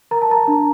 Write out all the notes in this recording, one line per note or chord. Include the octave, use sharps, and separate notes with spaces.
A#4 A#5
A5
A#4 A#5
D4